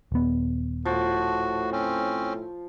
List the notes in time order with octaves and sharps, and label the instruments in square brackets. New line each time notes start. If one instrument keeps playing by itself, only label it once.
[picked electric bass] D#1 B3
[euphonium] A2 [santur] F3 [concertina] F#4
[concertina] C4 C#4